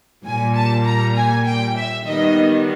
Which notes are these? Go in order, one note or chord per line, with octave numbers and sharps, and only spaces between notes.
A#2 G3 A#3 G#5
A5
A#5
G#5
G5
E5
D#3 G3 B3 D#5